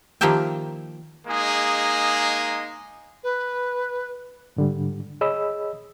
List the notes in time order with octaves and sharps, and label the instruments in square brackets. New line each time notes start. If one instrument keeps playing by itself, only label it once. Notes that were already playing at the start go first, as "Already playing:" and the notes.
[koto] D#3 F3 A#3 G4 E5 G5
[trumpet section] G#3 A#3 D#4 G#4
[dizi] B4
[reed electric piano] G#2 D3 G3
G#4 C#5 D#5 B5 E6